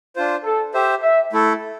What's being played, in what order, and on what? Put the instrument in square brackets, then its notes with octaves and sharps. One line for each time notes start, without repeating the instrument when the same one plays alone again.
[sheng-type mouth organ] D4 F4 C5
[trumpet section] A4
[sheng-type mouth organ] G4 C5 E5
[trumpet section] E5
[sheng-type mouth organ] A3 E4 A4